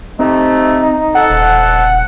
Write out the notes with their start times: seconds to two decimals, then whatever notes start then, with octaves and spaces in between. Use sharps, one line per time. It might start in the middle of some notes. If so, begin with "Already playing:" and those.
0.19 C3 A3 C4 D#4
1.15 F2 A4 F#5
1.30 D#1